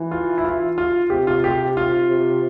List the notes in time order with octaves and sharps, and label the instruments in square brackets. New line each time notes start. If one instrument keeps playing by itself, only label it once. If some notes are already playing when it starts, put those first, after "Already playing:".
Already playing: [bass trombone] E3
[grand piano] F4
E4
F4
F4
[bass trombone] C3 [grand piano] G4
[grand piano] F4
G4
F4
[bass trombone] C3